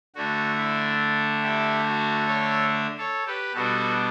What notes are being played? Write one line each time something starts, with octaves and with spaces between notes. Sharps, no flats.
D3 A3 D4 F#4
E4
E4 G4
F#4
A4 C#5
A4 C#5
G4 B4
B2 G3 B3 D4 F#4 A4